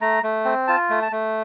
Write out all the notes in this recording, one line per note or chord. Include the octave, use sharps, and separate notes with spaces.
A3 A#5
A3
C4
F4 A5
A3
A5
A3